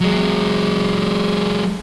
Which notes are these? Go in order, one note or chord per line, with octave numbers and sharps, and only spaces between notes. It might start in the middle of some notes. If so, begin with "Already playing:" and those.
F#3 G#3